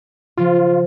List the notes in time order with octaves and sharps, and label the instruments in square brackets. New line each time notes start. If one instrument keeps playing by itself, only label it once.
[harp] C#3 F3 [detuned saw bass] F4